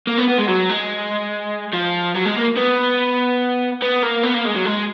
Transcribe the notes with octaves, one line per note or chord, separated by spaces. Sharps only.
A#3
B3
B3
G#3
F#3
G#3
F3
F#3
G#3
A#3
B3
B3
A#3
B3
A#3
G#3
F#3
G#3